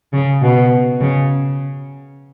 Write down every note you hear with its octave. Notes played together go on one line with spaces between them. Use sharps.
C#3
B2
C#3